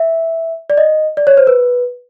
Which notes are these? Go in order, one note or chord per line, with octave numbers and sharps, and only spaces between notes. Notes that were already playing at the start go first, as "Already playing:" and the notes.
Already playing: E5
D5
D#5
D5
C#5
C5
B4